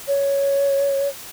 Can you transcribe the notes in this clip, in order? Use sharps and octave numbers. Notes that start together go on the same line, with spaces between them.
C#5